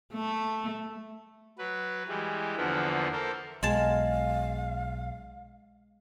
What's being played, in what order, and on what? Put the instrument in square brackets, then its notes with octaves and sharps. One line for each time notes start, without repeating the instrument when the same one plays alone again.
[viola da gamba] A3
[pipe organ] F#3 B4
E3 G3 G#3
E2 D3 E3 F3 A#3 B3
A4 A#4 C5
[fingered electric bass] B1 [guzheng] G#3 A5 [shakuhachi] F5